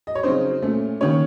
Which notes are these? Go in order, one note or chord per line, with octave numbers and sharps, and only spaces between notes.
D#5
C#5
C#3 F#3 C4 D#4 C5
A#2 A3 C#4
D#3 A#3 C#4 C#5